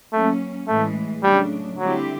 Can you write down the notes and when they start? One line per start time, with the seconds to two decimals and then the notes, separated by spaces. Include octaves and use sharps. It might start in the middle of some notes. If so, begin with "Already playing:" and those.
0.12 F#3 A3 A#3 C#4
0.68 A2 E3 G#3 A3
1.23 C#3 F#3 G3 A3 D4
1.79 D3 F#3 G3 C4 E4 G4